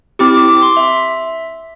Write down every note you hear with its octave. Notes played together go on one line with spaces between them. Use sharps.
C4 E4 G4 D6
D6
D6
C6
E5